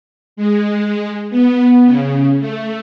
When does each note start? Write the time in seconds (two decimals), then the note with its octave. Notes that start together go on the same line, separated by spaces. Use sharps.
0.36 G#3
1.30 B3
1.85 C#3
2.40 A3